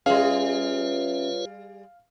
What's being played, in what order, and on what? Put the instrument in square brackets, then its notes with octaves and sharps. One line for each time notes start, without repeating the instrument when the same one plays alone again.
[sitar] G3 G#4 [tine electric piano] C#4 E5 [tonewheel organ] F4 B4 C#5 [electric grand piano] F5